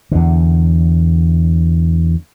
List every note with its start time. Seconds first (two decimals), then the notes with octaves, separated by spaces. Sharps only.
0.12 E2 D3